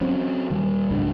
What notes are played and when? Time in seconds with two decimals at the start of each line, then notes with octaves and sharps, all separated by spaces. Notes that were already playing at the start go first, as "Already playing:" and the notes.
0.01 F#3 C4 C#4
0.50 D#1 D#3 G3
0.91 C#2 G#2 F#3 D4